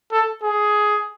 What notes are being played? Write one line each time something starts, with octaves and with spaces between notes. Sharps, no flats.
A4
G#4